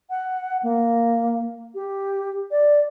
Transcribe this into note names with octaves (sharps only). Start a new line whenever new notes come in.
F#5
A#3
G4
D5